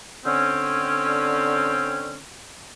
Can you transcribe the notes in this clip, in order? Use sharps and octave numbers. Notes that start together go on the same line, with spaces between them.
D3 C4 C#4